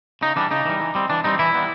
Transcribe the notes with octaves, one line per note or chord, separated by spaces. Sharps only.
C#3 D#4
E3 G3 D4
C#3 D#4
E3 G3
E3
G3 C4
E3 D4
G3 C4 D#4
E3 E4
G3 B3